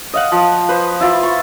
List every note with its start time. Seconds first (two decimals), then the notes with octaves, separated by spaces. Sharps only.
0.13 D#5 F5 F#5
0.32 F3
0.69 B4 C5
1.00 E4 F4
1.23 C#6